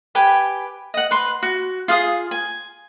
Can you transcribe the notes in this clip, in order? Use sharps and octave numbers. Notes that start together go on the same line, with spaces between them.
G4 B4 G5 G#5
D#5 F#5
B4 C6
F#4
F4 G#4 F5 D#6
G#5